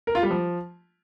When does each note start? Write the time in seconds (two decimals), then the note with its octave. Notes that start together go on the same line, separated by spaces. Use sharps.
0.07 A#4
0.15 F4
0.23 G3
0.31 F3